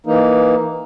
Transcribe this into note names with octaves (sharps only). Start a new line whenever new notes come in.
E3 A#3 D#4